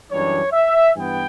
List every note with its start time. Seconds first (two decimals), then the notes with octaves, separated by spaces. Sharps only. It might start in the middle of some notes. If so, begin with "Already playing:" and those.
0.11 F#2 E3 G3 D4 C#5
0.53 E5
0.96 G2 E3 B3 G5